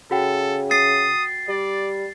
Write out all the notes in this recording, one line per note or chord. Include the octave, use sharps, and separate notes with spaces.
C#3 F#4 A4 F#5 G5
D#6 A6 C7
G3 D5